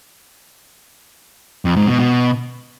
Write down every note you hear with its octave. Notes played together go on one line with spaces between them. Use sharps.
F2
G#2
B2
B2